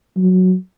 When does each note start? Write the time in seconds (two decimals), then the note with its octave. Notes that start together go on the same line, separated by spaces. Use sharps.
0.17 F#3